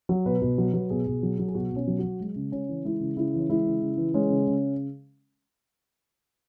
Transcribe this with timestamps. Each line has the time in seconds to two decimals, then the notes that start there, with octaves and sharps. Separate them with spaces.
0.09 F#3
0.25 B2 B4
0.42 B2
0.58 F#3
0.74 F#3
0.90 B2 G#4
1.07 B2
1.23 F#3
1.39 F#3
1.48 G#4
1.55 B2 F#4
1.71 B2
1.76 C#4
1.87 F#3
1.99 F#3 F#4
2.20 G#3
2.36 C#3
2.52 C#3 C#4
2.69 E3
2.85 G#3 E4
3.00 C#3
3.17 C#3 E4
3.34 E3
3.39 C#4
3.49 G#3 E4
3.66 C#3
3.82 C#3
3.97 E3
4.14 G#3 C#4
4.30 C#3
4.47 C#3